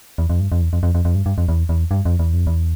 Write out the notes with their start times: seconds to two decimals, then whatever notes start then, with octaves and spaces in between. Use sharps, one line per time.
0.18 E2
0.30 F2
0.40 G2
0.52 F2
0.61 E2
0.73 F2
0.83 F2
0.95 F2
1.05 F2
1.15 G2
1.26 G2
1.38 F2
1.48 E2
1.69 E2
1.91 G2
2.05 F2
2.19 E2
2.33 F2
2.47 E2